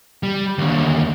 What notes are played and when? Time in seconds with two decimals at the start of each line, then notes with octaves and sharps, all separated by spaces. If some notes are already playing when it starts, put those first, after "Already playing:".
0.23 G3
0.58 D#2 D3